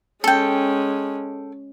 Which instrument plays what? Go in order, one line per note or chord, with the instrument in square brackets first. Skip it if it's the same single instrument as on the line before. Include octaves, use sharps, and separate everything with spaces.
[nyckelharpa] G#3 C#4 [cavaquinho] A4 G5